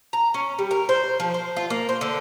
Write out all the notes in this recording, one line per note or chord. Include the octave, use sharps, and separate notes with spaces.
A#5
C#4
G3
A#4
C5
F3
C5
F4
A#3
C5
D3